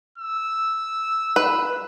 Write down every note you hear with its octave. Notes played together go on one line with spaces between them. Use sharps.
E6
B4